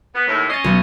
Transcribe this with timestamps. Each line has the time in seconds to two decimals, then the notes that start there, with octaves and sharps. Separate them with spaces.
0.14 B3
0.27 D#2 A2
0.50 C#4 D#5 A6 C7
0.64 B1